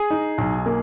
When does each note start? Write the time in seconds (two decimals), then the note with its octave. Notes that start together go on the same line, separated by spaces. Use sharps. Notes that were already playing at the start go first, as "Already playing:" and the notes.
Already playing: G#4
0.11 D#4
0.38 B1
0.66 A#3